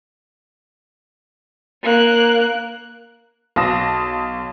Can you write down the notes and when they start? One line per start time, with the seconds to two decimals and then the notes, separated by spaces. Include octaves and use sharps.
1.83 A#3 F#6
3.56 B1 F5 A5 D#6 A#6 E7